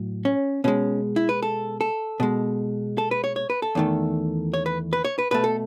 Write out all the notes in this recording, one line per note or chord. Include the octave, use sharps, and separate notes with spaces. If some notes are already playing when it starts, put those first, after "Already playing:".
Already playing: A2 F#3
C#4
B2 G#3 C#4
E4
B4
A4
A4
B2 G#3
A4
B4
C#5
C#5
B4
A4
E2 D#3 A3
C#5
B4
B4
C#5
B4
B2 A3 B4
A4